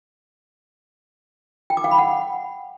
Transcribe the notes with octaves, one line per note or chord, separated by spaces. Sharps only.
G5
D6
F5
B5
F#5